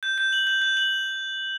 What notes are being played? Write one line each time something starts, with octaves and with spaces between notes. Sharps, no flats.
G6
G6
F#7
G6
G6
F#7